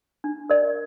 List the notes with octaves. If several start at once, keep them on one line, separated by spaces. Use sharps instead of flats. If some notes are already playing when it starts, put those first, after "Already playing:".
D4
A#4 D5